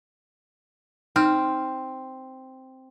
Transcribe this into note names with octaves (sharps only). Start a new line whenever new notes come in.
C4 D#4 F6